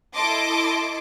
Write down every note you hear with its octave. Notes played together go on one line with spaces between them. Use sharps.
E4 A4 D#5 A5 C6 D6